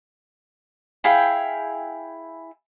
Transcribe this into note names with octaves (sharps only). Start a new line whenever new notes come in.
E4 G#4 F5 G5